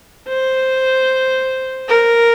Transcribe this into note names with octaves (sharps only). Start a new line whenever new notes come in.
C5
A#4